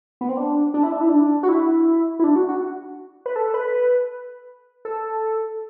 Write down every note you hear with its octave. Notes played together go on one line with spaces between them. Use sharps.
B3
C4
D4
D4
E4
D4
E4
D4
F#4
E4
E4
D4
F#4
F#4
B4
A4
B4
A4